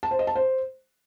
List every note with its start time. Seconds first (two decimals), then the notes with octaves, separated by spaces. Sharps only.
0.03 A5
0.11 C5
0.19 D#5
0.27 A5
0.35 C5